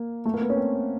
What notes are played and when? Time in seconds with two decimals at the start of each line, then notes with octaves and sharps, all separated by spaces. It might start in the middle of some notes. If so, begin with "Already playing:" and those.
Already playing: A#3
0.25 A3
0.34 A#3
0.41 B3
0.50 C#4
0.57 C4